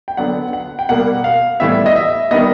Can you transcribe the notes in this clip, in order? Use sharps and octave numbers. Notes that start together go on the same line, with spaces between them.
G5
D3 F#3 B3 D4 F#5
F#5
G5
B2 G3 A#3 F#5
F5
A2 E3 G3 B3 E5
D#5
E5
D#3 G3 B3 D#5